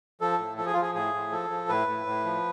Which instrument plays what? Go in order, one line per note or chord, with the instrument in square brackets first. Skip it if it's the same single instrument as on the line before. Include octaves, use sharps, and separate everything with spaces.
[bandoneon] F3 A4
A2
F3 A4
G#4
F3 F4
G#4
A2 G#4
A2
F3 A4
F3
A2 B4
A2
A2
F3